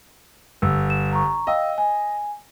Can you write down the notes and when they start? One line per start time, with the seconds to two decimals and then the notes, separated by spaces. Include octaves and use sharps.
0.62 G1 E6
0.90 E7
1.13 A#5 C#6
1.47 D#5 F5 G5 E6
1.78 G#5